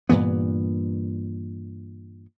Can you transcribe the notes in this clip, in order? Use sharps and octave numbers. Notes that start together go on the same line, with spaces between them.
G2 A#2 E3 B3